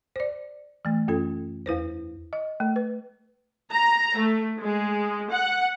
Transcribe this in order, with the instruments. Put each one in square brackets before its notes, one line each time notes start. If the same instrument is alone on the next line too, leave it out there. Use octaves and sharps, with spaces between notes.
[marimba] C5 D5
E3 A3
F#2 C#4 F4 A4
E2 E4 B4 C5
[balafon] D#5
A3
B4
[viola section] A#5
A3
G#3
F#5